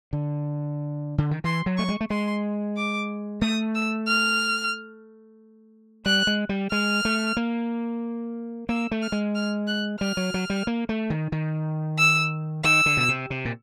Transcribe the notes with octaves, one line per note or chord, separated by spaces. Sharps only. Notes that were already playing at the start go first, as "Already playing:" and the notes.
D3
D3
D#3
E3 C6
F#3
A3 C#6
G#3
A3
G#3 C6
D6
A3 D#6
E6
F6
G3 F#6
G#3
G3
G#3 F6
A3
A#3
A#3 E6
A3
F6
G#3
F6
F#6
G3 F6
F#3
F#3
G3
A#3
A3
D#3
D#3
E6
D#3 E6
D3
B2
C3
C3
A#2